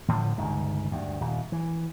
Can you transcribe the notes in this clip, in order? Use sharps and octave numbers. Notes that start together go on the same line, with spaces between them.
A2 D3 D#3 F3
G1 C#2 D#3
D2 G2
D#1
E3